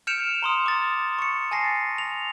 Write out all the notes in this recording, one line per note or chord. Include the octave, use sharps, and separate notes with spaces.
F6 G6 C#7 D7 E7 F7
A#5 C6 D#6
D6 A6
C#6 C#7
G#5 A5 A6 A#6 C7
F7